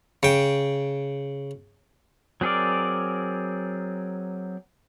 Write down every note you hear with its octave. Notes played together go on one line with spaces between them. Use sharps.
C#3 G5
F#3 C4 G#4 A#4 D5